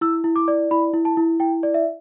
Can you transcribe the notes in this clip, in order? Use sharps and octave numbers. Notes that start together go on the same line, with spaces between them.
E4 E6
E4
D6
D5
E4 B5
E4
A5
E4
E4 G5
D5
E5